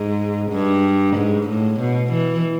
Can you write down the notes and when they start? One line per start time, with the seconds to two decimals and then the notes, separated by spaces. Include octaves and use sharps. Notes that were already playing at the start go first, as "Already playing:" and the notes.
Already playing: G#2
0.51 G2
1.16 G#2
1.48 A2
1.80 B2
2.12 E3